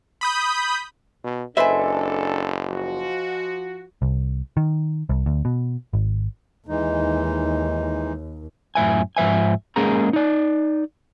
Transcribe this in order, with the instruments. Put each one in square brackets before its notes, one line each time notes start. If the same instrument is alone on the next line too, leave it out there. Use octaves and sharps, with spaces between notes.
[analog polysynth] B5 D#6 G6
[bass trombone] B2
[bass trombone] F#1 [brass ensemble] D4 A4 [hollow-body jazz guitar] B4 C5 E5 [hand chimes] D#5 G#5
[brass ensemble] F3 F#4
[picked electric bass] C2
D#3
C2
D2
B2
G#1
[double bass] D#2 [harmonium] E3 G#3 D#4
[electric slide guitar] F#2 A2 E5 G#5
G#2 F3 E5 G#5
G#3 A#3 C#4 G#4 A#5
D#4 D5